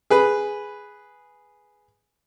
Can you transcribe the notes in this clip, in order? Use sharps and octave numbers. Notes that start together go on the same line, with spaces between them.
G#4 B4